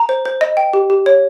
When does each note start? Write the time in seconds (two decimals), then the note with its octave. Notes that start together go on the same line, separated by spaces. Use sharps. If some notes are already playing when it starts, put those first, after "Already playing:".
Already playing: A#5
0.09 C5
0.25 C5
0.41 D#5
0.57 G5
0.73 G4
0.90 G4
1.06 C#5